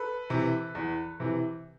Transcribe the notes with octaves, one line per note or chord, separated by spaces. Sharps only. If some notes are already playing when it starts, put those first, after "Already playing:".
Already playing: A4 B4
C3 E3
E2
C3 E3